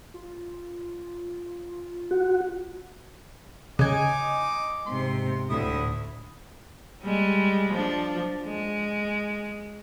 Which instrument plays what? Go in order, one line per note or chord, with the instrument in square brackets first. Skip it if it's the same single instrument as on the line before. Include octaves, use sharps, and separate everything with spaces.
[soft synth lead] F4
[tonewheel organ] F#4
[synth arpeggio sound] C#3 [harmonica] D#4 D6 [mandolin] D#5 G#5
[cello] G#2 C3 [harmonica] C6
[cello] D2 A2 [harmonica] E4 D#6
[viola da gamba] G3 G#3
F3 D4
G#3